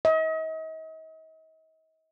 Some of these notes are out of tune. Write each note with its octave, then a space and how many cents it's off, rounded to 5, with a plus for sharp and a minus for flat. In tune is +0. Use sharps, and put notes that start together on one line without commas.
D#5 +40